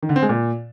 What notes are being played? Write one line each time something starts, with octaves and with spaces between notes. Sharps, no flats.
D#3
D3
C4
G#3
A#2